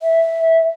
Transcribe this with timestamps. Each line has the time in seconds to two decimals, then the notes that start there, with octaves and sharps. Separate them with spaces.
0.02 E5